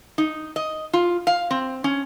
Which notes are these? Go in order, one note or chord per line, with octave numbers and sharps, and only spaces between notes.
D#4
D#5
F4
F5
C4
C#4